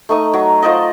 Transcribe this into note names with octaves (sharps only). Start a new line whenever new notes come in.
A3 D#4 C#6 D#6
F#3
F4 C5 D5 D#5